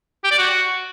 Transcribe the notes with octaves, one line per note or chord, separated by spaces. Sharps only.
G4
D5
F#4